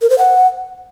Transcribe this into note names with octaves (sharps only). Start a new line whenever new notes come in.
A#4
C5
F#5